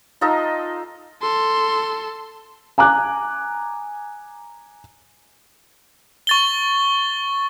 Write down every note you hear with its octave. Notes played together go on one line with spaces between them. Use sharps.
D#4 F4 A4 D#5
A4 C6
G#5 A#5 D6 F#6
C#6 A6 G7